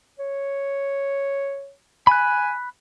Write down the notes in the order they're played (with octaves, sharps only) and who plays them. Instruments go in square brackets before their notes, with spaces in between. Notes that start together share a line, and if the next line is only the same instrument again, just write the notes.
[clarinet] C#5
[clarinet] G#5 [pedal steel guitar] B5 F#6